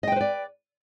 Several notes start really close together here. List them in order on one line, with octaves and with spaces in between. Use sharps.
D#5 G5 B4 C5 D5